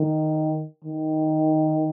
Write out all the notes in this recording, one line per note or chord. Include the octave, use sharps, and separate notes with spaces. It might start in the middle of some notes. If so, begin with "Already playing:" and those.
Already playing: D#3
D#3